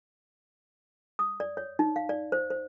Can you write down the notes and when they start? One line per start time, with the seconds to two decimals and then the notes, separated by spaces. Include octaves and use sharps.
1.19 D#6
1.40 D5
1.57 C#5
1.79 D#4
1.96 F5
2.09 D5
2.32 C5
2.50 C5